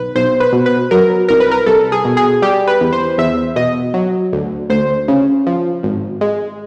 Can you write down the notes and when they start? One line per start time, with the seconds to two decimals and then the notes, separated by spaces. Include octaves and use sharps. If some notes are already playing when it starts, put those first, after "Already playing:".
Already playing: B1 B4
0.16 B1 C5
0.40 B4
0.53 B2
0.66 B4
0.91 F#3 A#4
1.28 C2 A#4
1.40 B4
1.51 A#4
1.66 C2 A4
1.92 G#4
2.05 B2
2.17 G#4
2.42 G3 G4
2.67 B4
2.81 E2
2.93 C5
3.18 E2 E5
3.56 B2 D#5
3.94 F#3
4.33 D2
4.70 D2 C5
5.08 C#3
5.47 F3
5.83 G#1
6.21 G#3